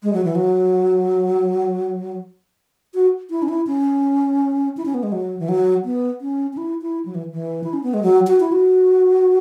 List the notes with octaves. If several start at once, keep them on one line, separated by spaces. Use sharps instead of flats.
G#3
F#3
E3
F#3
F#4
E4
C#4
E4
C#4
E4
C#4
B3
G#3
F#3
E3
F#3
B3
C#4
C#4
E4
E4
F#3
E3
E3
E4
C#4
B3
G#3
F#3
F#4
E4
F#4